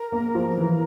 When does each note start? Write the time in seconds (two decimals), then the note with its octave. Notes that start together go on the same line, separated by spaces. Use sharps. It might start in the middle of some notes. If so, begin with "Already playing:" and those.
Already playing: A#4
0.12 A#3
0.35 F3
0.58 E3